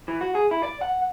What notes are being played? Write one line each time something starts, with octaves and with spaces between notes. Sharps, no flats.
E3
F#4
G#4
E4
D5
F#5